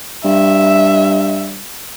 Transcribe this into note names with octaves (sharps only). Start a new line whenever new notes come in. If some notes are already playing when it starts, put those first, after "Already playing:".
G2 E5